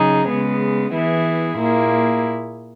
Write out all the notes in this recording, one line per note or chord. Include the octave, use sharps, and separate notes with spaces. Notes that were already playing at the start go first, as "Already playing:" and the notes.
Already playing: C#3 F#3 D#4 G#4
C#3 G#3 B3
E3 B3 E4 G#4
A#2 A#3 E4 G#4